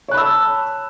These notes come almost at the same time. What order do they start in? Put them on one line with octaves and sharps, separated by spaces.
C#5 F#6 B5 E6 A5